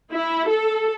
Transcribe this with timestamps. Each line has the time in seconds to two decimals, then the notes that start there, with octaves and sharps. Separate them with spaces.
0.11 E4
0.48 A4